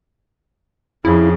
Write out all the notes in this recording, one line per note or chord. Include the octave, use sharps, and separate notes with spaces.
F2 C#3 E4